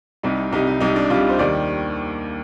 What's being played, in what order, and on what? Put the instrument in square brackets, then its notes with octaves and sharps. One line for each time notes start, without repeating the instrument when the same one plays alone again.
[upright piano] C2 C3 G3 D#4
C2 C3 G3 D#4
D#4
C2 C3 G3 D#4
D4
C2 C3 G3 F4
C5
D#2 D#3 G3 D5